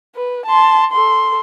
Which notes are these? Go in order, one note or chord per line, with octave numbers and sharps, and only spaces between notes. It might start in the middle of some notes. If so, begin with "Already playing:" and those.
B4
A5 C6
A4 C6